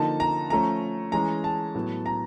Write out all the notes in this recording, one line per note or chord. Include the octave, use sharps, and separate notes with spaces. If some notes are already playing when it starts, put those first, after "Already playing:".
Already playing: D3 F3 A#3 D#4 A5
A#5
F3 A3 C#4 A#5
E3 G#3 C#4 A#5
A5
A2 F#3 B3
A#5